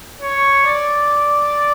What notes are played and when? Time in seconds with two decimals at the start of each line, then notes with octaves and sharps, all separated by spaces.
0.21 C#5
0.66 D5